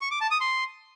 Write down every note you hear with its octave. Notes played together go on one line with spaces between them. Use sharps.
C#6
D6
A5
D#6
C6